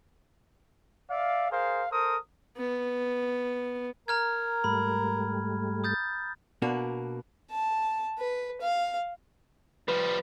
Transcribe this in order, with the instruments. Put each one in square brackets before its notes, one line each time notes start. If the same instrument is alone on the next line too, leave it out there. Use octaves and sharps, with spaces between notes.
[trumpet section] D5 E5 F5
G#4 A#4 C5 F5
A4 A#4 C5 D#6
[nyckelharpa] B3
[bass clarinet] A#4 [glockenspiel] A#5 F6 G#6
[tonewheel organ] G#2 G3 A3 [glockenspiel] B5
[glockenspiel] D#6 G6 A6
[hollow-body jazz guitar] B2 A#3 D4 F#4
[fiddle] A5
B4
F5
[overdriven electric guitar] F3 G3 [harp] B4